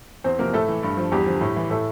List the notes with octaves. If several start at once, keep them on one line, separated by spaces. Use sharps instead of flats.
E2 C4 C5
C3 F3 A#3 A#4
A2 A3 A4
E3
G2
F3
E2 G3 G4
D3 F3
A2
E3
A2 A3 A4